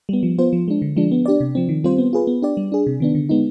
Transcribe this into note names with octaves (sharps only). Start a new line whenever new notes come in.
G3 B3
F3
B3 F4 C5
F3
G#3 D4
D3
F3 G#3 D4
B3
D4 G4 D5
C3
F3 C4
D#3
G3 C4 F4 C5
B3
F4 G#4 B4
B3
D4 G4 D5
G3
D4 G#4
C3
D#3 B3 D4
D3
G#3 B3 D#4